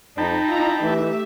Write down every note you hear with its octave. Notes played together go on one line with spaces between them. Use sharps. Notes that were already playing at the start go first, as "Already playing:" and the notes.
F2 D#4 G5 A5 B5
E4 F4 A#5
E3 A3 G4 E5